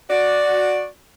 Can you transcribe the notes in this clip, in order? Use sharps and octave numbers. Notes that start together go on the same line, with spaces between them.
F#4 D5